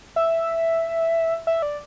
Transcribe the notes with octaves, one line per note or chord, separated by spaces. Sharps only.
E5
E5
D5